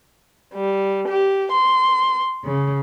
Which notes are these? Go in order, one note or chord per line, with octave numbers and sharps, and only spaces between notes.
G3
G4
C6
C#3